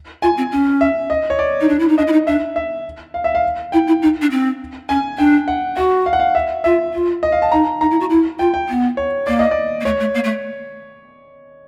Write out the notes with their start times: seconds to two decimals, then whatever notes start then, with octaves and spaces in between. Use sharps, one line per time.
0.22 F4 G#5
0.37 C4
0.52 C#4
0.81 E5
1.10 D#5
1.30 C#5
1.39 D5
1.61 D#4
1.68 D4
1.79 E4
1.88 D#4
1.97 D4 D#5
2.07 E4
2.12 D#4
2.27 D4 E5
2.56 E5
3.14 F5
3.24 E5
3.35 F5
3.72 E4 G5
3.87 E4
4.02 D#4
4.21 D4
4.31 C4
4.89 C#4 G#5
5.18 D4 G5
5.48 F#5
5.76 F#4 F#5
6.06 F5
6.13 F#5
6.20 F5
6.35 E5
6.64 F4 E5
6.93 F4
7.23 D#5
7.32 F5
7.42 A5
7.52 D#4 A#5
7.81 D#4 A#5
7.91 E4
8.00 F#4
8.10 E4
8.39 F4 G5
8.54 G5
8.69 B3
8.97 C#5
9.27 A#3 D5
9.39 D#5
9.51 D5
9.80 A#3
9.85 A3 C#5
10.00 A3
10.14 A#3
10.24 A3